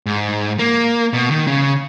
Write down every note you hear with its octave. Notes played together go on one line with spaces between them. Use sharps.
G#2
A#3
B2
D#3
C#3